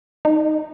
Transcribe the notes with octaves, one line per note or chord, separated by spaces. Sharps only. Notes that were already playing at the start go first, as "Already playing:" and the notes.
D#4